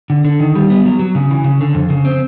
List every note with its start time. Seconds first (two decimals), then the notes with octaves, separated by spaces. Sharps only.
0.10 D3
0.25 D3
0.40 D#3
0.55 G3
0.70 B3
0.85 F#3
0.99 F#3
1.15 C#3
1.31 E3
1.45 C#3
1.61 D3
1.75 F2
1.90 C#3
2.05 C4